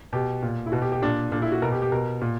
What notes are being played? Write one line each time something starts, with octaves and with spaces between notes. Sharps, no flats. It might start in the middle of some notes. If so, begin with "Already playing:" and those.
B2 G4
A#2
E4
B2 F#4
G4
G4
A#2 D4
A#2 D4
E4
F#4
B2 A#4
G4
G4
B2 A#4
A#2